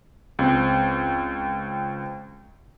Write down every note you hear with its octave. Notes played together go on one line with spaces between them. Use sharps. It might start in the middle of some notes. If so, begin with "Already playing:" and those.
C#2 C4